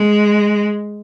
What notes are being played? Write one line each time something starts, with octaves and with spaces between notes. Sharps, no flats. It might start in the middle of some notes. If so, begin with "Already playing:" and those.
Already playing: G#3